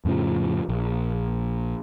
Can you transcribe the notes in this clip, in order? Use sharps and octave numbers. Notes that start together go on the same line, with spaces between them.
F2 A2 C#3 F3
A#1